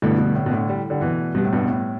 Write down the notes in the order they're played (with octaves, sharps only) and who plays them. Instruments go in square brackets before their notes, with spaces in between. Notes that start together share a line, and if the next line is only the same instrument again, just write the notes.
[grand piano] G2 B2 [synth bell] D3 A3 E4 A4 D5
[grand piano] G2 B2
A2
B2
A2 D3
G3
D3 G3
B2 E3
[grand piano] B2 [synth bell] G3 B3 G4
[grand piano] A2
G2 B2
A2